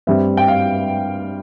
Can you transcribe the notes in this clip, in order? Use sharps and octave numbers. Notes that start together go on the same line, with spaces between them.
G2 G3 C4 E5
G5
F5